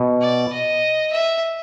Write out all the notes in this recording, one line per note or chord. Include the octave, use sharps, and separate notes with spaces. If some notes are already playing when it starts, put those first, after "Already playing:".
Already playing: B2
D5
D#5
E5